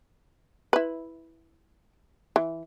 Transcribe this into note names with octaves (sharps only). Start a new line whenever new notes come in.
E4 B4
E3